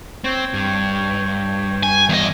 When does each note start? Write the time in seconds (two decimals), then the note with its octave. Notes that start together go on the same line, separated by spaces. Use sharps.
0.24 C4 C#5 G5
0.54 G2
1.83 G#5
2.09 E2 D#5